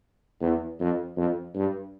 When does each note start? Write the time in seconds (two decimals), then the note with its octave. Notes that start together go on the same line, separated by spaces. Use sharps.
0.41 E2
0.80 F2
1.17 F2
1.55 G2